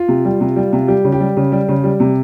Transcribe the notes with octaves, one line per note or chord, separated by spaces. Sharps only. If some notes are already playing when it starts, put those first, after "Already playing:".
Already playing: F4
C3
G3
C3
G3
C3
G3 G4
C#3
G4
G3
C#3
G3
C#3
G3
C3